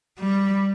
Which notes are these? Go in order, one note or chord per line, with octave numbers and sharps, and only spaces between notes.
G3